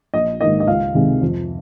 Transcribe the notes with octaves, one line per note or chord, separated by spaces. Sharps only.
A#1 D#5
G#2 D#3 A#3 D#5
D#5
C#2 F5
C3 D#3 G#3 C4
F2